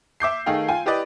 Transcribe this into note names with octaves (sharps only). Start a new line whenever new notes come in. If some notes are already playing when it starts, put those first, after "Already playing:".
E5 D6 G6 C7
D#3 A3 D#4 G#4 F5 G5
F4 G5 G#5
E4 G4 B4 D5 D#5